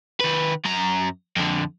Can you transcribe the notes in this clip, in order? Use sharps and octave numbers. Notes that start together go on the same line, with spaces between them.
D#3 B4
F#2 A#5
F2 D3